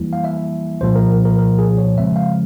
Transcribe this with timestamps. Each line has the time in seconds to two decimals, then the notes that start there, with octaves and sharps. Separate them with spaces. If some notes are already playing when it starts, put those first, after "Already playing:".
Already playing: F2 E3 G3 A#3 E4
0.13 F5
0.24 E5
0.81 C2 A#2 F3 C5
0.95 A#4
1.25 A#4
1.39 A#4
1.58 G#4
1.77 C#5
1.97 F2 C#3 F3 G#3 C4 E5
2.16 F5